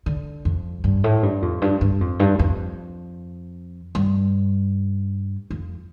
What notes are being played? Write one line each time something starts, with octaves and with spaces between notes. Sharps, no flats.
D3
F2
G2
A2
G2
F2
G2
G2
F2
G2
F2
G2
F2